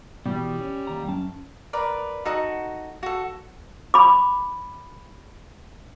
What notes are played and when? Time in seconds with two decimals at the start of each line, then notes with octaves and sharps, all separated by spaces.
0.26 B2 E3 G3
0.61 C#4
0.87 D#2 A#5
1.08 F#2 C#4 A5
1.73 A#4 B4 D5 B5
2.25 D#4 F#4 A4 F#5
3.03 F#4 A4
3.94 B5 D6